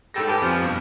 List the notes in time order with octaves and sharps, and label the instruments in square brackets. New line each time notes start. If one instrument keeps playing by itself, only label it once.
[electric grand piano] G#2 G5 A#6 [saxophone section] G3 A4
[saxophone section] G4 [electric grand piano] B4 G#5 A5
[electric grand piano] F2 [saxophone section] F3
[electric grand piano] G2 B2